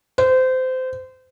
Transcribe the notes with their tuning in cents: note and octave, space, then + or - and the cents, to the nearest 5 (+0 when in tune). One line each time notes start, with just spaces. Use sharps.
C5 -25